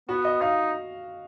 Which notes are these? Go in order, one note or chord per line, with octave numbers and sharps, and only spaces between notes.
B3 F#4
D#5
D#4 F5